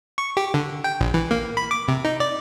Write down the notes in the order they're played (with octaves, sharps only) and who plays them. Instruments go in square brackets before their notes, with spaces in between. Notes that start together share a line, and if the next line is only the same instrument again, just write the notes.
[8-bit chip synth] C#6
G4
D3
G5
A#1
E3
A#3
B5
D6
C3
D#4
D5